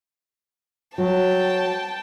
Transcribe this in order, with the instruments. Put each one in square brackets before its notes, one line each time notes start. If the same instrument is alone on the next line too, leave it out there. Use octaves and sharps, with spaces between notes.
[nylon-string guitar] F#3 [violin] G5 A5